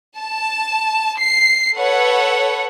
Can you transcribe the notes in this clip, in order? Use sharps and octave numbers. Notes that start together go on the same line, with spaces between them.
A5
C7
A4 B4 C#5 F#5